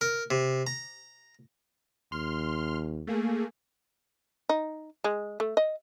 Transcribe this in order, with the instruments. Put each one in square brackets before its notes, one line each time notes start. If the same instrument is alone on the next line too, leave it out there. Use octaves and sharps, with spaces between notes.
[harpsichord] A#4
C3
A#5
[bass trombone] D#2 [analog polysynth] C6 F6
[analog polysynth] A3 A#3 G#4
[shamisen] D#4
G#3
A3
D#5